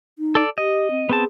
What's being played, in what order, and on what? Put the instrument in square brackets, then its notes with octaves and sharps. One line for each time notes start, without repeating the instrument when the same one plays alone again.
[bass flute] D#4
[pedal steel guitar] A4 D5
[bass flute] G4 [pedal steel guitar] D#5
[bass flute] C4
[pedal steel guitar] B3 C4 A5 [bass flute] G#4